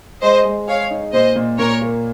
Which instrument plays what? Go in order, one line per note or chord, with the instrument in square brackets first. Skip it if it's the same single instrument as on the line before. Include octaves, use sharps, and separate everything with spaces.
[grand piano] G#3 [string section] C5 D#5
[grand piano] G#3
[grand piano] G#4 [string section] C#5 F5
[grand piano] D#4
[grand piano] A#2 [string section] C5 D#5
[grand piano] A#2
[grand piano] A#2 [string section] A#4 C#5
[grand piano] A#3